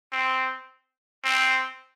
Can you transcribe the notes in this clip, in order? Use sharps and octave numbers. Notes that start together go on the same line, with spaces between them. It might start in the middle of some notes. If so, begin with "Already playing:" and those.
C4
C4